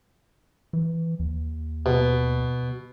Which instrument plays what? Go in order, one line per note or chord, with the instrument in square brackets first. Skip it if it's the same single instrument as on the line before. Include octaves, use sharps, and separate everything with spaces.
[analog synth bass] E3
D#2
[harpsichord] B2